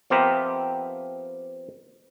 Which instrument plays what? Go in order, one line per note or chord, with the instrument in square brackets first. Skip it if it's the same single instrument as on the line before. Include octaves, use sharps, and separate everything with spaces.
[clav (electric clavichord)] F3 B3 C4 G4 A#4 E5